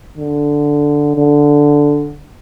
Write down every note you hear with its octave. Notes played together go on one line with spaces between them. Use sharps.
D3
D3